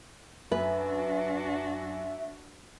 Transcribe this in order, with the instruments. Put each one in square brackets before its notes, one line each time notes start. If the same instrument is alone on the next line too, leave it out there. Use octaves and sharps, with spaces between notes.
[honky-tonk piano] F#2 [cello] D4 F#4 [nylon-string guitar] B4 [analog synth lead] E5